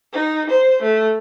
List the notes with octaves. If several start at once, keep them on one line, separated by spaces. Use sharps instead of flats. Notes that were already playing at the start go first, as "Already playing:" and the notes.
D#4
C5
A3